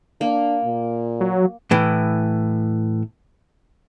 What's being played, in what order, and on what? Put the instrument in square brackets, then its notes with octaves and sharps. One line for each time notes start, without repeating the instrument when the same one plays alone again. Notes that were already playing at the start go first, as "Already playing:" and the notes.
[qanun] A#3 [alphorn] D4
[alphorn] A#2
[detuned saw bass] F#3
[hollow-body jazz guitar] A2 E3